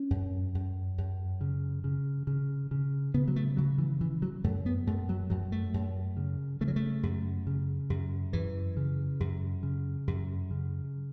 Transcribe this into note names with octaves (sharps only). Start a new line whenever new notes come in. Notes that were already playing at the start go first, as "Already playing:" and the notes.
Already playing: C#4
F#2
F#2
F#2
C#3
C#3
C#3
C#3
C#3 B3
F#3
A3
C#3 F#3
E3
C#3 E3
F#3
F#2 A3
B3
F#2 A3
F#3
F#2 F#3
A3
F#2
C#3
C#3 A3
F#3
A3
F#2
C#3
F#2
F#2 E3
C#3
F#2
C#3
F#2
C#3